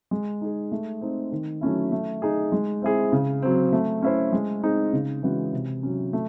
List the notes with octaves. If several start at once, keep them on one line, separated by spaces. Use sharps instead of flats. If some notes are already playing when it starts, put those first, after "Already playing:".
G#3
D#4 G#4
A3
C4 D#4
D#3
F#3 A3 C#4 E4
A3
D#4 G#4
G#3
C4 E4 G#4
C#3
F#3 C4
A3
C#4 E4 C5
G#3
C4 D#4 G#4
C#3
E3 G#3 C#4 F#4
C3
F#3 C#4
A3